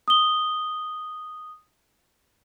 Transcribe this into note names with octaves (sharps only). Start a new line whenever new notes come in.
D#6 G7